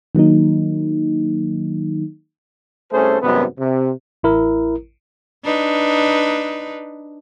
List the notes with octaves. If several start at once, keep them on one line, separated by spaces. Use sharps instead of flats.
D#3 F#3 A#3 D#4
C2 A3 C#4 G#4 A4 C5
G#1 F#2 C3 G3 B3
C3
A1 E4 A#4
D4 D#4 B4